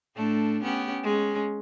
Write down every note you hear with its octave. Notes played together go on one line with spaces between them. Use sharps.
A2 A3 D4
B3 C#4 G4
G#3 C#4